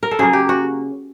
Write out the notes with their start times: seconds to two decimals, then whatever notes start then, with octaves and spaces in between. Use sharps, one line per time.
0.03 A#4
0.11 A4
0.19 C#3 F#3 A#3 G#4
0.33 G4
0.49 F#4